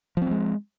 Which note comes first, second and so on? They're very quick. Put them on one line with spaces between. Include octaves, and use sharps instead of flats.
F3 C4 F#3 G#3